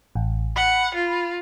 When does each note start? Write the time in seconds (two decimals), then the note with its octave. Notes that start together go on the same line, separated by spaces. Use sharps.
0.15 A1
0.56 F#5 B5
0.94 F4